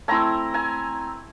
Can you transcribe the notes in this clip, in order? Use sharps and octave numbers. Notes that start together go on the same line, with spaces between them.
A3 C4 E4 G#5 A#5
G#5 A#5